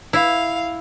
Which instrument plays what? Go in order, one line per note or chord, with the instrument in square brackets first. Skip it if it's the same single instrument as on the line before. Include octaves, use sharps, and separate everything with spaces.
[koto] E4 [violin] F5